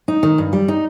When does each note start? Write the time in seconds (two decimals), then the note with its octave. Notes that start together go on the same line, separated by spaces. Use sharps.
0.08 D#4
0.23 D#3
0.38 G2
0.53 G3
0.68 D#4